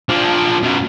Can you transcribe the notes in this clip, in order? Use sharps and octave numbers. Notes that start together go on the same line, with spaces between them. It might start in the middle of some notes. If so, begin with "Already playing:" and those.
F3 D4
F#2 B2